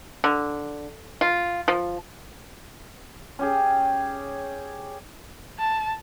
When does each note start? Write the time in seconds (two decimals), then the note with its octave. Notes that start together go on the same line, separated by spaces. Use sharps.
0.24 D3
1.21 F4
1.68 F3
3.39 C#4 G4 G#4
5.59 A5